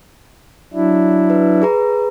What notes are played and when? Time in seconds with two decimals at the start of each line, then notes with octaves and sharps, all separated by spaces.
0.74 F#3 D4 E4
1.30 B4
1.62 G#4 B4 A#5